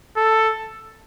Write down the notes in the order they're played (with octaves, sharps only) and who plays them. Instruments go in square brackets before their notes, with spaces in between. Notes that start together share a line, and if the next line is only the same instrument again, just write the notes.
[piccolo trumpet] A4